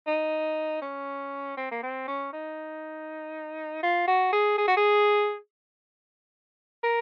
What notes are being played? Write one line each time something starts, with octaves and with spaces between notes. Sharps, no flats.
D#4
C#4
C4
A#3
C4
C#4
D#4
F4
F#4
G#4
G#4
F#4
G#4
A#4